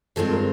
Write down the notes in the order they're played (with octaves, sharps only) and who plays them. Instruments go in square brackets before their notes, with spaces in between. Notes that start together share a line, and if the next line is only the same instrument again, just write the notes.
[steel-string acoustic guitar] G2 D#3 G#3 C4 F4 [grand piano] A4
[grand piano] A#4